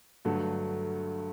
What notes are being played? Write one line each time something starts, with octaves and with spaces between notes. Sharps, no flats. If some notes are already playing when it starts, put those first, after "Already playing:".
G2 D3 F#3 A3